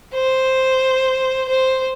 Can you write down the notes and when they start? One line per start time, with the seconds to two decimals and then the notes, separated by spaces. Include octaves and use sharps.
0.14 C5
1.49 C5